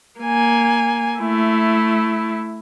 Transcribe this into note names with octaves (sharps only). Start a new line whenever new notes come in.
A#3 G#5
A3 E4